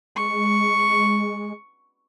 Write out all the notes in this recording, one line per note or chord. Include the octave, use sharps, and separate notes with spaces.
G#3 C#6